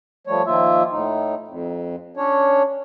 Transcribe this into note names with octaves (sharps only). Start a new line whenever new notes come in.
F3 G3 A3 C#5
D#3 F3 A#3 F4 E5
A2 D#4
F2
C#4 D4 C#5